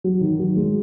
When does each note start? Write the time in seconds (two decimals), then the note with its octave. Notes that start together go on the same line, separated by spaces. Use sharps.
0.04 F#3
0.21 D#3
0.39 F#3
0.56 G#3